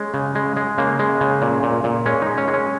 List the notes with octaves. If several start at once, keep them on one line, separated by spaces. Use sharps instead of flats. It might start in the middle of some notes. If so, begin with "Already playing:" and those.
Already playing: G#3 C#4
C#3
G#3
G#3
C#3 A#3
G#3
C#3
A#2
A#2
A#2
G#3 C#4
G#3 D#4
C#4
G#3
C#4